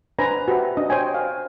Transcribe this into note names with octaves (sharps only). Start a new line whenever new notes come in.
D4 B4 C5 G#5 A#5
F#4 G4 B4 C5 E5
D4 D#5
C5 C#5 G5 G#5
F5